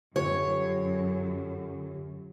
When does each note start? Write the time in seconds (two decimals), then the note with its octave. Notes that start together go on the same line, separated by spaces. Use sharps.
0.16 F#2 D3 F4 G4 C#5